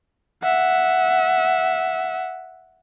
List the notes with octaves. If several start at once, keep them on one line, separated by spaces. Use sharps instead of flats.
E5 F#5